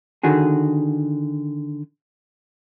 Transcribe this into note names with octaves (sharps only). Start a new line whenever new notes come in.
D3 D#3 F#4 G#4